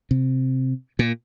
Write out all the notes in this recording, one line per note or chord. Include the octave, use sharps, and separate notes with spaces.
C3
A#2